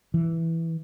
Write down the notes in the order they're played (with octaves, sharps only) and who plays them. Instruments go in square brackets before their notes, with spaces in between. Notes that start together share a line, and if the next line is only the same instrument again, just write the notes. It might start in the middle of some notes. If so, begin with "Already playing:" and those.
[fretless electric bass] E3